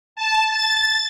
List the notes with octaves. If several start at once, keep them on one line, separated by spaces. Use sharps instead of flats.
A5
A6